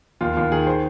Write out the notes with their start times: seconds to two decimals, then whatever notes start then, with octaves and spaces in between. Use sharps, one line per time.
0.21 D#2 F4
0.36 D#2 F4
0.52 D#3 G#4
0.67 C5